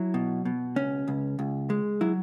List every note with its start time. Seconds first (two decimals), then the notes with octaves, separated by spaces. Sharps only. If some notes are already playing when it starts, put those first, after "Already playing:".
Already playing: F#3 E4
0.14 B2
0.45 B2
0.76 C#2 C#4
1.08 C#2
1.39 C#2
1.70 G#3
2.01 F#3 E4